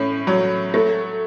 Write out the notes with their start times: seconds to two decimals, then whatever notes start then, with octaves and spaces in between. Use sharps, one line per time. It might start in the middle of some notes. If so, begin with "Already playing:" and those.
Already playing: A2 C#4
0.27 F#3
0.74 A3